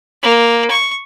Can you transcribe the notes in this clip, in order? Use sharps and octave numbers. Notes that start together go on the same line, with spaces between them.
A#3
C#6